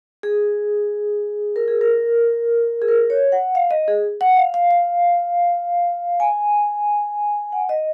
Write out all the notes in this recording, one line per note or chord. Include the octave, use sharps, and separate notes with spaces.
G#4
A#4
G#4
A#4
G#4
A#4
C#5
F#5
F5
D#5
G#4
F#5
F5
F5
F5
G#5
F#5
D#5